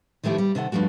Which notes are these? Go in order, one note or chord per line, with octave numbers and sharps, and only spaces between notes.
D#3 F3 A3 E4 G4
G3
C3 D#3 A4 F#5
G2 D#3 F3 A3 F#4